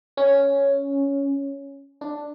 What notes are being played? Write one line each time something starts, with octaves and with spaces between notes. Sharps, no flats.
C#4
D4